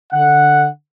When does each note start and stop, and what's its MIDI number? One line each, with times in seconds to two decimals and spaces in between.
0.13 0.67 50
0.13 0.67 78